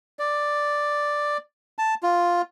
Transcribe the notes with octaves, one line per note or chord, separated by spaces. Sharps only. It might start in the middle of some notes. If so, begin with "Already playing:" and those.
D5
A5
F4